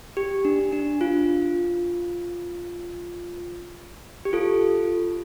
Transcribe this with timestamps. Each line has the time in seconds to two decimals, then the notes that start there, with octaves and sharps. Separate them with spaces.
0.17 G4
0.45 D4
0.72 D4
1.01 F4
4.25 G4
4.33 F4 A4